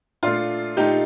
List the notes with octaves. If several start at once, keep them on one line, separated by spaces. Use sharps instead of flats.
A#2 A3 D4 F4
A#2 A3 D#4 G4